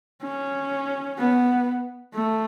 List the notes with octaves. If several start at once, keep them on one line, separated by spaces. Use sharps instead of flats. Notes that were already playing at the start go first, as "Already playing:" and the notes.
C#4
B3
A3